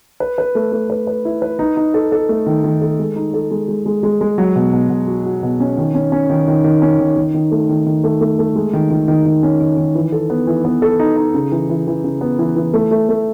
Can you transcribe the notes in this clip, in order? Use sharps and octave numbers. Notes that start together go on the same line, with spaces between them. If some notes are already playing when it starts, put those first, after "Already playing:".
B4
B4
A3
A3
B4
B4
E4
B4
D#4
D#4
A4
A4
A3
D#3
D#3
A4
G#3
D#4
A4
G#3
G#3
G#3
G#3
G#3
F#3
B2
B2
B2
F#4
F#4
B2
C#4
D#3
C#4
C#4
D#3
D#3
D#3
C#4
D#3
D#3
D#3
A3
D#3
D#3
A3
A3
A3
G#3
D#3
D#3
D#3
D#3
C#4
D#3
D#3
E3
A4
B3
E3
B3
A4
D#4
D#4
C#3
E3
E3
E3
C#3
B3
E3
E3
A3
A3
A3